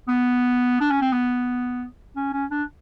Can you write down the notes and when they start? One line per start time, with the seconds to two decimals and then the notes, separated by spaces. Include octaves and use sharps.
0.08 B3
0.81 D4
0.91 C#4
1.02 C4
1.12 B3
2.16 C#4
2.33 C#4
2.51 D4